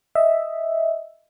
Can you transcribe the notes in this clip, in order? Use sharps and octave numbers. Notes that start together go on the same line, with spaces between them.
D#5 E5